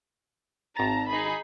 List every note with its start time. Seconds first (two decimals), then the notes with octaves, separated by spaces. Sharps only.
0.77 G#1 A5 A#5 A6
1.09 D#4 G#4 B5